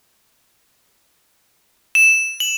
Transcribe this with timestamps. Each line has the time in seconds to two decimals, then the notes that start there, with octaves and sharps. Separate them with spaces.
1.95 E7
2.40 F#7